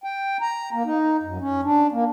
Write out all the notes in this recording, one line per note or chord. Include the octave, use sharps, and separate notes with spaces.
G5
A#5
A#3
D#4
F#2
C#4
D4
A#3